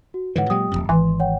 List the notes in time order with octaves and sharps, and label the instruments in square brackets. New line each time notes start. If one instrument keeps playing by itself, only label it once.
[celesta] F#4
[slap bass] G#2 D3 E3 [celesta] B4 C#5 F#5
[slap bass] A#2 F#3 G#3 [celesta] G4 G5 D#6
[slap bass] D1 B1 F2
[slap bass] G#1 [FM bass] E3 [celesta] C6
[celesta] C#5 F#5 G5